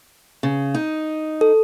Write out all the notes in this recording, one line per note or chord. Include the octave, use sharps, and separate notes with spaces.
C#3
D#4
A4